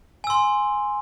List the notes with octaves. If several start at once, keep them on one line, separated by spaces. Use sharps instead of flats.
G#5 C6 E6